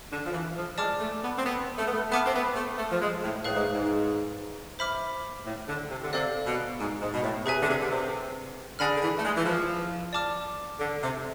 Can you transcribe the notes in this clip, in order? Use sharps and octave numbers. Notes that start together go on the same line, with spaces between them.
D3
F3
E3
F3
G#3 D5 A5 D6 F6
A3
B3
C4
B3
A3
B3
A3
B3 E5 A5 D6 F6
C4
B3
A3
A3
F3
G#3
A2
A2 G#4 B4 F5
G#2
G#2
C5 E5 B5 D6 F6
A2
D3
C3
D3
C3 A4 D5 F5
B2
G#2
G#2
B2
A2
C3 G#4 B4 E5 G#5
D3
C3
D3
C3
D3 G#4 D5 G#5 B5 F6
D3
E3
A3
G#3
E3
F3
D5 A5 D6 F6
D3
C3